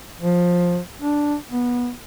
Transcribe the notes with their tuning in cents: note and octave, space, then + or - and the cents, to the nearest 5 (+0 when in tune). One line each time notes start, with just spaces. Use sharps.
F3 +15
D4 +0
B3 -20